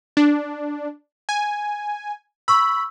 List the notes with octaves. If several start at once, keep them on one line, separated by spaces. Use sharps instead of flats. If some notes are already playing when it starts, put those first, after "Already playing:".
D4
G#5
B5 C#6 E6